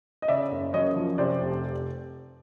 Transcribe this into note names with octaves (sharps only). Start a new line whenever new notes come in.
D#5
C#3 D5 E5
F#1
F#2 C#5 D#5
F3
C3 C5 D5
F1